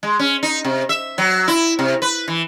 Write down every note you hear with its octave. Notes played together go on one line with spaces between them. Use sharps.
G#3
C#4
D#4
C3
E5
F#3
E4
C3
B4
E3